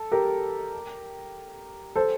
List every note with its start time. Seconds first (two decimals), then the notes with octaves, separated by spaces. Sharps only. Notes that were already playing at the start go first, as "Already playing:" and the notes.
Already playing: A4
0.12 G4 A#4
1.95 A4 C5